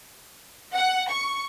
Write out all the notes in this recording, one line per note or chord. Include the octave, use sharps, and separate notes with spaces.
F#5
C#6